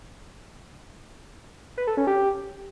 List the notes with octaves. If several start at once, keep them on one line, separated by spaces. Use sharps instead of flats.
B4
A4
C#4
G4